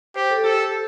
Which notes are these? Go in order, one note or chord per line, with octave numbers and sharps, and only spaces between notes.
G4 C5
A4
G4 A4